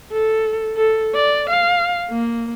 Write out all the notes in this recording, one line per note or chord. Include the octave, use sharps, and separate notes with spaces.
A4
A4
D5
F5
A#3